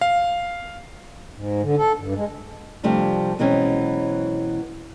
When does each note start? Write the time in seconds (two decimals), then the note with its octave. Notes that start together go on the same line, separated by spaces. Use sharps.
0.01 F5
1.34 G#2
1.62 D3
1.78 A4
1.99 G2
2.15 G#3
2.83 C3 F3 G3 A3 D4
3.39 B2 E3 F#3 G#3 C4 C#4